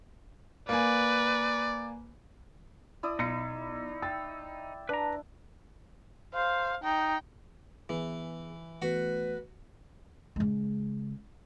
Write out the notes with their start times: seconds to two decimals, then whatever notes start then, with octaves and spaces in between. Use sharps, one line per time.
0.69 A#3 B4 D5 G#5
3.03 E4 D5 D#6
3.19 B1 D#4 E4 C#7
4.02 G5 E6 A6
4.89 D4 B4 A#5
6.34 C5 F5
6.84 D#4 G5
7.89 E3 B3 G#4
8.82 E3 A3 B3 F#4 B4 F#5
10.36 C#3 G#3